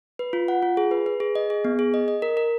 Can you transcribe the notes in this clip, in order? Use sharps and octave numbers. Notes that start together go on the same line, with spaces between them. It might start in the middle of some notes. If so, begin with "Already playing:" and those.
B4
F4
F#5
F4
G#4
B4
B4
G#4
D#5
G#4
B3
G#4
D#5
D#5
A#4
A#4